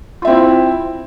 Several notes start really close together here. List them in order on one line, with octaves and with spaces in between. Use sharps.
F4 E5 C4 E4